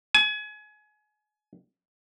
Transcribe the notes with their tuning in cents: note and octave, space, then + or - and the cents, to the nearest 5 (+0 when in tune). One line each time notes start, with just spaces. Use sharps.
G#5 +30